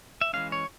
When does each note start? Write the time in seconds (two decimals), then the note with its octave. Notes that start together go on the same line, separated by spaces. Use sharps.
0.21 E5
0.33 E3 G#3 C#4 F5
0.52 C#5